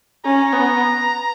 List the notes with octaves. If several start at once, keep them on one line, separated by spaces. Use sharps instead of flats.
C#4 A#5
B3